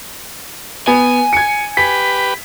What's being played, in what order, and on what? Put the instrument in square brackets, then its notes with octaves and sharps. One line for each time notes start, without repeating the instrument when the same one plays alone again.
[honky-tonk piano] B3 [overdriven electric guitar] G#5
[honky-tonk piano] G#6 C#7
[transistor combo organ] G4 B4 [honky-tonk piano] B6